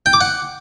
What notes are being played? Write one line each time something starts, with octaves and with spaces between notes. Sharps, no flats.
G5
D6
F#5